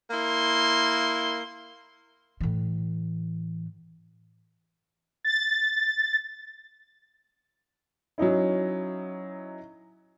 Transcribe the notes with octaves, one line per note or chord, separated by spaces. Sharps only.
A#3 E4 C6
A2 E3
A6
F#3 C#4 D#4 E4